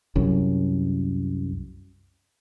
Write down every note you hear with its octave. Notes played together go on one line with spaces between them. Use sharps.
C2 F#2